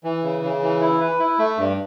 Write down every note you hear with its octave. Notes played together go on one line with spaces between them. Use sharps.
E3
C#3
C#3
E3
E4
B4
E4
A3
G2